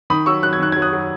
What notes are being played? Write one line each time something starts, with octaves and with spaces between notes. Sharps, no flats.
D#3 B5 D#6
F#3 C#6 E6
F#3 F#6
G#6
D#3 F#6
F#3 G#6
D#6 F#6
F#3